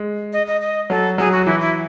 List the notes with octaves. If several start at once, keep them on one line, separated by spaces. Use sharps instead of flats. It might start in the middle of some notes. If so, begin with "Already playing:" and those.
Already playing: G#3
D#5
D#5
D#5
F#3 A4
F#3 G#4
F#4
E3 E4
E4